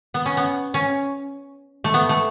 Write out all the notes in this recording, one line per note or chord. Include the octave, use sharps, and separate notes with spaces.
B3
C#4
B3
C#4
A3
B3
A3